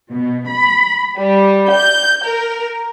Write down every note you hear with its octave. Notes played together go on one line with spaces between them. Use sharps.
B2
B5
G3
G6
A#4